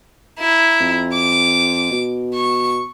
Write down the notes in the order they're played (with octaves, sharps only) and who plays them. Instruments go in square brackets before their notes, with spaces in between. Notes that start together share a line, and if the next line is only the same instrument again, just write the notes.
[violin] E4 A#5
[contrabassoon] F2
[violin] D6
[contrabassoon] B2
[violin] C#6